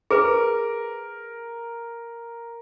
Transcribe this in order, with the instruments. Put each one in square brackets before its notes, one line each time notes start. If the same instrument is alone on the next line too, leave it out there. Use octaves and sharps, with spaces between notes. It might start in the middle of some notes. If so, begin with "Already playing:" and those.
[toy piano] G#4 B4 [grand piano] A#4